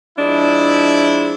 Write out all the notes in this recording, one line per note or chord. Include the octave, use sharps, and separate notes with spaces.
F3 G#3 D4 E4